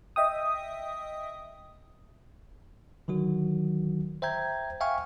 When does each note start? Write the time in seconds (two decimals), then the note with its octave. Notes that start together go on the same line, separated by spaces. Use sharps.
0.16 D#5 E5 G5 D#6
3.08 D3 D#3 F#3 F#4
4.22 C5 E5 G5 A#5 G6 G#6
4.81 E5 F5 G5 G#5 C#6 F6